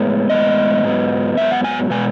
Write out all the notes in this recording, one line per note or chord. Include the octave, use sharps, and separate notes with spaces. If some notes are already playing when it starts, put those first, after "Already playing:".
Already playing: A2 G#3 B3 C#5
A2 G#3 B3 D#5
G#2 F#3 B3
G#2 F#3 B3 E5
F#5
G#5
B2 G#3 B3 G#5